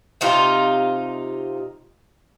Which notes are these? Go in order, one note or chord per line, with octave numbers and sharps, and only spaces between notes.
C3 D#4 F4